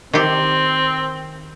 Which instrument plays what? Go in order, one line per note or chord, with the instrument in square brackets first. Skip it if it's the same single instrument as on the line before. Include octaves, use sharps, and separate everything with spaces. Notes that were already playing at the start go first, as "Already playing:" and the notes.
[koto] D#3 G4 [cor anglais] C4